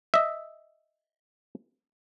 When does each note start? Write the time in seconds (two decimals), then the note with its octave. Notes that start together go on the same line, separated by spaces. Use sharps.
0.14 D#5 E5